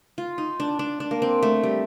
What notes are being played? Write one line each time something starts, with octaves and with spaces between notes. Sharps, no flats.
F4
D#4
D4
D4
D4
A#3
C4
A3
G3